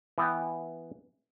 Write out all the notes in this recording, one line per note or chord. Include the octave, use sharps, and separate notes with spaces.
E3 B3 G5